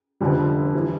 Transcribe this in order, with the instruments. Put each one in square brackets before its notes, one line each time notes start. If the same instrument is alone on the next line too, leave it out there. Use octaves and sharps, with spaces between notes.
[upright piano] F1 F2 D3 G3
E3 G3